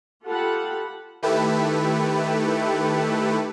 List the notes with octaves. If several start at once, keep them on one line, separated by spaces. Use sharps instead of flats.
F4 G4 A4 F#5 A5 B5
D#3 A3 E4 G4 A4 B4